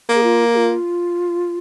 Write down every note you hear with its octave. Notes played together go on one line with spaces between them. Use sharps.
A#3
G#4
F4
G#4
F4